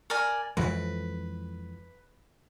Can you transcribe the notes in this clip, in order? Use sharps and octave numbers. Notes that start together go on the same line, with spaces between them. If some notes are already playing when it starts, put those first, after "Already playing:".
A#4 D5 G#5
F2 E3 G#3 B4